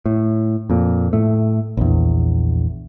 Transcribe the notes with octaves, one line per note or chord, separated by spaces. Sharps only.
A2
F2 A#2
A2 A3
A#1 E2